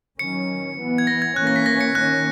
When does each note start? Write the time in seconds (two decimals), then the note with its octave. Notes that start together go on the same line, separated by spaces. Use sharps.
0.19 D#3 F#3 C#4 C#7
0.78 E3 B3
0.98 G#6
1.07 A#6
1.22 G#6
1.36 E3 A#3 C#4 F#6
1.47 A#6
1.56 B6
1.66 A#6
1.81 C#7
1.95 D#3 A#3 C#4 F#6